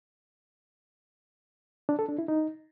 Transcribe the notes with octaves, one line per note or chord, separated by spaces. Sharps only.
D4
A4
D4
E4
D#4